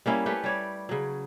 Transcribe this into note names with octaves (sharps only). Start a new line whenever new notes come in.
G3 A#3 C#4 E4
A3 C#4 G4 B4
G3 C#5 D5
C#3 F#3